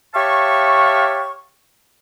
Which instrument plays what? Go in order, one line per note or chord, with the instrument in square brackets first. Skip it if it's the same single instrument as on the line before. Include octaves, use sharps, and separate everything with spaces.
[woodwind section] G4 C#5 E5 F5 A5 C#6